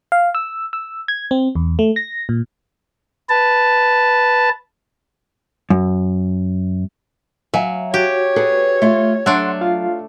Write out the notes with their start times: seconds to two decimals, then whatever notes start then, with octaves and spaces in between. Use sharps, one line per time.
0.12 F5
0.35 E6
0.73 E6
1.08 G#6
1.31 C4
1.55 E2
1.79 A3
1.96 A#6
2.29 A#2
3.29 B4 A5
5.70 F#2
7.54 F#3 E5 F5 G#5
7.94 F#4 G4 C#5
8.36 G#4 A4 B4
8.82 A3 F4
9.26 F#3 A3 D4 F#5 C6
9.61 F4 F5